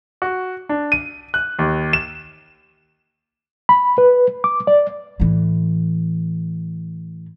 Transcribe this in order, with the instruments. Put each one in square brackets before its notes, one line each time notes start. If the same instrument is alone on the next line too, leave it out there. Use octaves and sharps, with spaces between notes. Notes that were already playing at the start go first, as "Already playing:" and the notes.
[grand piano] F#4
D4
D#7
F#6
D#2
E7
[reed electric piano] B5
B4
D6
D5
[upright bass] A2 E3